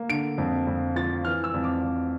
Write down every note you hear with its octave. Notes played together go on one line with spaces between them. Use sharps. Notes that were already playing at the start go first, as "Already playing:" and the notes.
Already playing: A#3
D3 D7
F2
F2
F3 A6
E3 F6
E6
F2
D6
F2